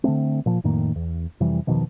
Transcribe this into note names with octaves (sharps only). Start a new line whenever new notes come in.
D3 F#3 A3 C4
A#2 F3
F2 A2 D#3 A#3
E2
F2 C3 E3 G3
E1 B2 D#3 F3